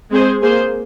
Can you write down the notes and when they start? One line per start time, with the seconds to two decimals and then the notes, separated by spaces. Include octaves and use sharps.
0.11 G#3 C4 G#4 C5
0.42 A#3 G#4 C5